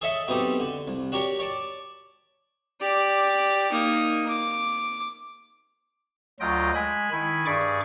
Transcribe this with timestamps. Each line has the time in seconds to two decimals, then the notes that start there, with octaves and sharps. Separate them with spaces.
0.01 G#4 A4 C#5 D#5 E5 A5
0.28 F#3 B3 C4 D#4 G4 A4
0.60 D3
0.87 C2
1.12 D4 F#4 G4 A#4 C#5
1.39 C#5 D5 A5
2.81 G4 D5
3.72 A#3 D#4
4.29 D6
6.40 D2 F#3 F4 D#5 G5 A#6
6.74 G#3 G#5 B5
7.11 D#3 E4 G#5 B5
7.46 G2 G#4 D5 C#6 D6